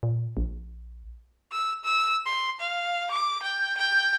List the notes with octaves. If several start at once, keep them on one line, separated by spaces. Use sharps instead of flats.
A#2
A#1
E6
E6
C6
F5
D6
G5
G5